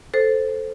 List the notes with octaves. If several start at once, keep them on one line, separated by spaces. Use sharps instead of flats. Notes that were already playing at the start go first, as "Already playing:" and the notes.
A4 C5